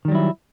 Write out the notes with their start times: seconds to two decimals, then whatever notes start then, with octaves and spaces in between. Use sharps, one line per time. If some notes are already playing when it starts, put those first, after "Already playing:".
0.05 D#3
0.08 G3
0.12 F#3
0.15 E4